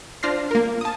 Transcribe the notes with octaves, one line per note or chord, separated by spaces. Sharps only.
D4 F4 C5 F6 A#6 C7
A#3 A#4
A5 D#6